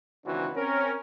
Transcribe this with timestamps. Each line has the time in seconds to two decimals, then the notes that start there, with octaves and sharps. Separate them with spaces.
0.25 C#2 D#3 E3 C4 D4 F#4
0.55 C4 C#4 A#4